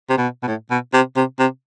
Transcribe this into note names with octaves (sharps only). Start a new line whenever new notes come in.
C3
B2
B2
A2
B2
C3
C3
C3